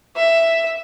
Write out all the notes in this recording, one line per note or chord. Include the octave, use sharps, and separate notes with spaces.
E5